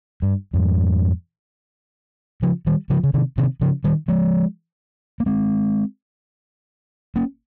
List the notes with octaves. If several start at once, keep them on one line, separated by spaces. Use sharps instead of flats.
G2
F2 G#2
C#3 F3
D#3 G3
C#3 F3
C#3
C3 D#3
C3 D#3
C#3 F3
D#3 G3
F3 G#3
A#3
G#3 C4
A#3 C#4